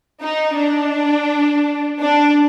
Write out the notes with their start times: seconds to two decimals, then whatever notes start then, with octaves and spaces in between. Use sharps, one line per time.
0.22 D#4
0.57 D4
2.00 D4